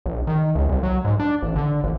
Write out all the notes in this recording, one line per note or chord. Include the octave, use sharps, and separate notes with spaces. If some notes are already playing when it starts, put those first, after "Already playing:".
A#1
D#3
C#2
C2
F#3
G#2
D4
A1
D3
A1